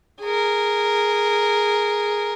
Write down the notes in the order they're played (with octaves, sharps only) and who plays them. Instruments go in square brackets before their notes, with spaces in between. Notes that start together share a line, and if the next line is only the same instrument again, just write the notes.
[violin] G#4 A#4